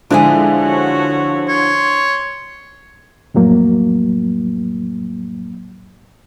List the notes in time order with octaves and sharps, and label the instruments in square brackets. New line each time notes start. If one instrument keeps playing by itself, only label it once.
[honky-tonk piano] D3 F3 [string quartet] G#3 [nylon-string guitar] D4 E4 G#4
[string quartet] F#4 C#5
[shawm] C#5 [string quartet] C6
[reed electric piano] F2 A2 F#3 A#3